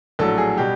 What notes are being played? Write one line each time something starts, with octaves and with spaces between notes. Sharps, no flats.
A#1 A2 F#3 A4
G#4
B2 G3 G4